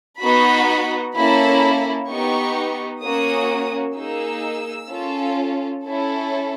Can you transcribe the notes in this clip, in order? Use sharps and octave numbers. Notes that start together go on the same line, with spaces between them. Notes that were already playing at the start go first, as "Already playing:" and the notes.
B3 D#4 F#4 B5
A#3 C#4 E4 A4 B5
B3 D#4 G4 C#6
A#3 C#4 F#4 D#6
A#3 D#4 G#4 E6
C#4 F4 A4
C#4 E4 A4